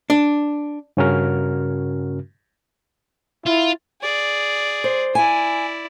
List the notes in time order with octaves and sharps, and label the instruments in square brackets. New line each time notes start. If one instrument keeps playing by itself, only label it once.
[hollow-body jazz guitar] D4
[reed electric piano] G2 C#3 C#4 F#4 A#4 F6
[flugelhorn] E4 [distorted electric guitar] F4
[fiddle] G#4 D5
[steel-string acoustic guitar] C5
[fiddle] E4 D5 [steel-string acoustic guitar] G#5